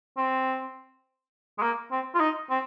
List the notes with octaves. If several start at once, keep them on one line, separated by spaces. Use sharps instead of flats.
C4
G#3
A#3
C4
F4
D#4
C4